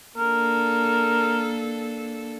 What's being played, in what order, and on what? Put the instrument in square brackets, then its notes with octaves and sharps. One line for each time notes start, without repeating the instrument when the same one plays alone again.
[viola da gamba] A#3 D4 A4 [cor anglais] A#4